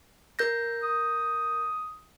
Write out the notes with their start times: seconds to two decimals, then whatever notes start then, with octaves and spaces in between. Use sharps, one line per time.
0.39 A#4 G6 A#6
0.83 D#6